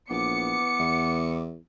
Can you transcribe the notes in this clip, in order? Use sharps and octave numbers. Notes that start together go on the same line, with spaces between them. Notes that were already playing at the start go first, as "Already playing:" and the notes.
A#1 E3 B3 D6 C#7
E2